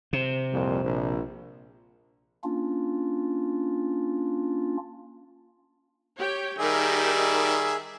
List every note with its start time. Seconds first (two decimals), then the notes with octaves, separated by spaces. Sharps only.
0.13 C3
0.53 C2 F2 A#2
0.84 A#1
2.44 A#3 C#4 D4 F4
6.17 G4 C#5 G5
6.58 D#3 G3 D#4 G4 G#4 A#4 E5